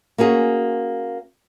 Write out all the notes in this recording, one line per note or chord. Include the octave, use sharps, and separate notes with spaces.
A#3 C#4 F#4 G#4